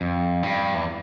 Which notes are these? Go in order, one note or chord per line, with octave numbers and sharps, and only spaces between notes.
F2
G2
E2